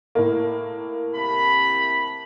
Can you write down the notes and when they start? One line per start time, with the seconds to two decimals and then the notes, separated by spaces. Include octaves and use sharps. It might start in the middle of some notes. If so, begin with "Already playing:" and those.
0.15 A2 A#3
1.15 C3 A5 B5